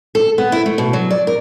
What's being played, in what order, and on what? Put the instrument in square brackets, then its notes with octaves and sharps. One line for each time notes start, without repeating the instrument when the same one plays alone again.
[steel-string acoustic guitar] A4
B3
E4
A3
B2
F#3
D5
A#4